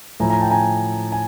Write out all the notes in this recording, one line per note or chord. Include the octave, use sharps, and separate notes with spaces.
A2 F3 G#5 A#5
G#5 A#5
G5 A5
G#5 A#5
G#5